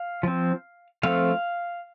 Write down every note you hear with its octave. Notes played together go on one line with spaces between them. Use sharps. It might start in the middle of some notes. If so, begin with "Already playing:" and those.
Already playing: F5
F3 C4
F3 A3 C4 F5